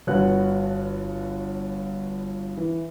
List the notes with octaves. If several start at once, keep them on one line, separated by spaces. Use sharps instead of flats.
G1 D3 F#4 B4 C#5 F#6
E3